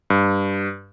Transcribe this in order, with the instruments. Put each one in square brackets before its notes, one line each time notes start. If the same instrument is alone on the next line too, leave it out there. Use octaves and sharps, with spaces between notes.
[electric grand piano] G2